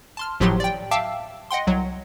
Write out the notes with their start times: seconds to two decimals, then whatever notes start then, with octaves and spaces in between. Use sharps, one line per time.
0.17 A5 C6 F6
0.40 G#1 A2 F3 F#3 G4 C6
0.60 D5 G5
0.91 E5 F5 G5 A5 D6 E6
1.51 D#5 F#5 G5 C6
1.67 C2 F#3